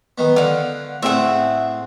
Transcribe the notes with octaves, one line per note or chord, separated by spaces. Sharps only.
D#3 B3
D3 F5 F#5
A2 C4 G#4 E5 F#5